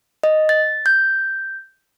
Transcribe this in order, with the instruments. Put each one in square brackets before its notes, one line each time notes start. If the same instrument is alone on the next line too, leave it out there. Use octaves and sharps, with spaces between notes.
[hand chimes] D#5
A6
G6